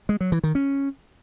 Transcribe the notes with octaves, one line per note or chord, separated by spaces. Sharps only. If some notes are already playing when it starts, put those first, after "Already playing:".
G#3
F#3
E3
D#3
C#4